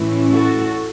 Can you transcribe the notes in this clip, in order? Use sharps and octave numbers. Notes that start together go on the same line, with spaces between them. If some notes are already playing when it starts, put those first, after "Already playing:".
Already playing: A2 E3 A3 C#4 E4
F#4 A4